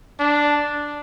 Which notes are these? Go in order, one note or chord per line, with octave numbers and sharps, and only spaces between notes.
D4